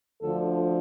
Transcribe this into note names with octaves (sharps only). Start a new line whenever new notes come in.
D2 D3 F3 A4